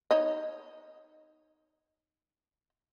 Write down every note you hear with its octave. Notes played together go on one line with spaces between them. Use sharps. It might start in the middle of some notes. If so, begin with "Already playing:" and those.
D#4 C#5 D#5